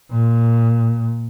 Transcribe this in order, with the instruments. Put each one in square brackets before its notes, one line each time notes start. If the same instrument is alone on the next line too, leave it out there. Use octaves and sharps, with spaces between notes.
[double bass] A#2